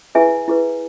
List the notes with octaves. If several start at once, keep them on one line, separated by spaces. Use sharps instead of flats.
E4 G#4 B4 E5 G#5
E4 G#4 B4